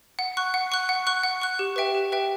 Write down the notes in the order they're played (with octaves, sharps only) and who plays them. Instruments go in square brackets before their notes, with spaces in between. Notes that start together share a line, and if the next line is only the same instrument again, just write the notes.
[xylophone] F#5
C#6 F#6
F#5
C#6 F#6
F#5
C#6 F#6
F#5
C#6 F#6
G4
B4 E5 G5
G4
B4 E5 G5